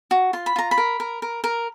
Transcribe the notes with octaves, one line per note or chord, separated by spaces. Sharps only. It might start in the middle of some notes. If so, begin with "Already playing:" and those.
F#4
F4 C6
B5
F4 A#5
B5
A#4
A#4
A#4
A#4